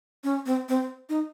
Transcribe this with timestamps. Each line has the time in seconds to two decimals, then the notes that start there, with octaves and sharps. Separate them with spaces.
0.24 C#4
0.46 C4
0.69 C4
1.09 D#4